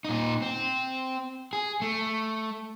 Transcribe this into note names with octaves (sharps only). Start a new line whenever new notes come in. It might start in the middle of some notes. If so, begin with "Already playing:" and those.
A#2 D#4
C4
G#4
A3